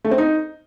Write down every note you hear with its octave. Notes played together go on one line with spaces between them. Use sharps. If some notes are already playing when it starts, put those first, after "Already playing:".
A3
C4
D#4